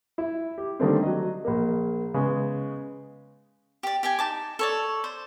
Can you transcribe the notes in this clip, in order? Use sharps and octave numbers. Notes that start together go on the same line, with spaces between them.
E4
G4
D3 D#3 G3 A3 A#3 C4
F#3 D#5
A#1 A#3
C#3 G#3 B3
G4 D5
G4 G5 G#5
D#4 A5 D6
A4 C#5 D5
C5